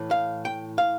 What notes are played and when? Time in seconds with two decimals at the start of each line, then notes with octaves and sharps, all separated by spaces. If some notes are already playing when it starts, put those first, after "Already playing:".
Already playing: A2 E3
0.11 F5
0.45 G5
0.78 F5